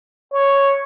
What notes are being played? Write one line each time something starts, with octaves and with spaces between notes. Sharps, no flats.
C#5